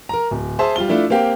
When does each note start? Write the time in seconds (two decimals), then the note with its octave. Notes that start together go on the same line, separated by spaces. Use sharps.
0.09 A#4 A#5
0.31 D1
0.59 G#4 C5 E5 A5 C6
0.76 G3 F4 G7
0.89 A3 D4 E4 F4
1.10 A#3 C4 G4 F5 G5